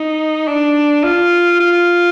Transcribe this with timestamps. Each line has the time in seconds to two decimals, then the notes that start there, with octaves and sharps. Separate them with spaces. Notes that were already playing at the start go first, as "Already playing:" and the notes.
Already playing: D#4
0.47 D4
1.03 F4
1.60 F4